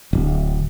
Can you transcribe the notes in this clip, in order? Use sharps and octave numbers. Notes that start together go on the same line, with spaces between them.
D1